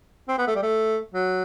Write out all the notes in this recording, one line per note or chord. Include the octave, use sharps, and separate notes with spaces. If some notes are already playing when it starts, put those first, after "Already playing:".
C4
B3
A3
G3
A3
F#3